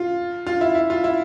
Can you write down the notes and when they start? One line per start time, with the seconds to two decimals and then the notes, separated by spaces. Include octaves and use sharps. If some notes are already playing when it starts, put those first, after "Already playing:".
Already playing: F4
0.46 F4
0.61 E4
0.75 E4
0.90 F4
1.04 E4